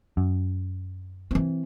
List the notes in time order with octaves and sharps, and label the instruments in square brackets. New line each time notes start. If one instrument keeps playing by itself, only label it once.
[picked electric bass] F#2
[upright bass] E3 C4